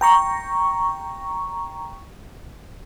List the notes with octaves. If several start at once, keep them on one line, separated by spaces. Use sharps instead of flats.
G5 A#5 C#6